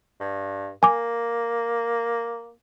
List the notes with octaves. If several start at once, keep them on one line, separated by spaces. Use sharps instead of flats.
G2
A#3 G#5 D6